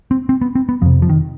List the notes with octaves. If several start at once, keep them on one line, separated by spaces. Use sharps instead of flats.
C4
C4
B3
C4
B3
F2 C3 F3
F3
D#3